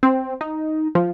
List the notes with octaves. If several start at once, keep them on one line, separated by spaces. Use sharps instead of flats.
C4
D#4
F3